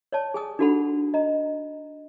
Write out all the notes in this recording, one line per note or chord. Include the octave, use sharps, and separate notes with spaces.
C#5 D5 A5
G#4 G#5 D#6
D4 D#4 F#4 A4 F#5 B5
D#5 A#5